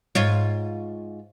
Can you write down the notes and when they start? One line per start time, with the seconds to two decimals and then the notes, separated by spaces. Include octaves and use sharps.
0.15 G#2 F4 C#5